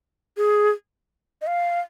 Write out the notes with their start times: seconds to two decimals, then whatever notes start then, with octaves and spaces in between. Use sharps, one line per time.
0.37 G#4
1.42 D#5
1.47 F5